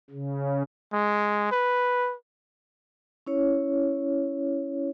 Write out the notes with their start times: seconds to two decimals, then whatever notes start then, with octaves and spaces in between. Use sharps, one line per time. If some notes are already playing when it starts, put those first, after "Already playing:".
0.11 C#3
0.93 G#3
1.51 B4
3.27 C#4 E4 C#5